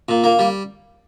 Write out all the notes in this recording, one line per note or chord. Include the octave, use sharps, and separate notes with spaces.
A#2
A#3
G3